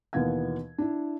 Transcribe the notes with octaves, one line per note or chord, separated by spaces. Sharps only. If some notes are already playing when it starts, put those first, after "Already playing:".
D#2 B2 E3 B3 F5 G#6
D4 E4